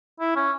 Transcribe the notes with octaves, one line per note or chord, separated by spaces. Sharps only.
E4
C#4